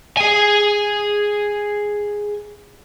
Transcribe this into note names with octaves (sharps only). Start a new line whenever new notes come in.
G#4 G#5